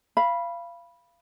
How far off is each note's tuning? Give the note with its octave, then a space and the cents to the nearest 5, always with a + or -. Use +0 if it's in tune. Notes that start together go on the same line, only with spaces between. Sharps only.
F5 -25 B5 -10